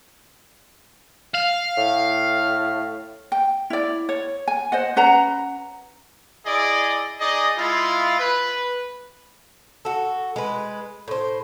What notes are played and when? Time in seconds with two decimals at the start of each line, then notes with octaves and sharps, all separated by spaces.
1.35 F5
1.77 A2
3.32 G5
3.70 E4 D5
4.09 C#5
4.48 G#5
4.72 C5 D#5 F#5
4.96 C#4 B4 F#5 A#5
6.45 E4 G#4 D5 D#5 D6
7.19 D#4 G#4 D5 D#5
7.57 G#3 E4 F4
8.18 B4
9.85 F#4 A4
10.36 G#3 B4
11.08 A2 C5